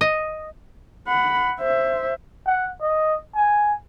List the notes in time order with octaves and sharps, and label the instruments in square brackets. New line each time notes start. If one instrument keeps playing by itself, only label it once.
[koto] D#5
[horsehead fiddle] F#5 B5
C5 E5
[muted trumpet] F#5
D#5
G#5